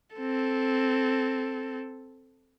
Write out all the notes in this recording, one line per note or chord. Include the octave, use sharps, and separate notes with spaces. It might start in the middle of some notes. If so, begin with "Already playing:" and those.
C4 A4